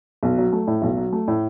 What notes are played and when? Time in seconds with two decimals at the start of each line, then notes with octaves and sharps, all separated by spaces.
0.23 B1
0.38 F#3
0.53 A3
0.67 A2
0.82 B1
0.97 F#3
1.13 A3
1.28 A2